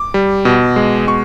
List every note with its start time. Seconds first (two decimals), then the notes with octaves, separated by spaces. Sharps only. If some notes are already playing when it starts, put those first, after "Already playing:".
Already playing: D6
0.14 G3
0.45 B2
0.76 G#3
1.07 B2 C#6